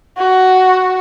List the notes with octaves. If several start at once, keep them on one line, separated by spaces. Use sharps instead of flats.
F#4